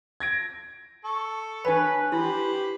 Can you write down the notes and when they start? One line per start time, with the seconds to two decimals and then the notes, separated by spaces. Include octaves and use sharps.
0.20 G#6 A#6 D7
1.05 A4 C#6
1.65 D4 B4 C#5 G#5 B5
2.12 E4 G4 B4 C5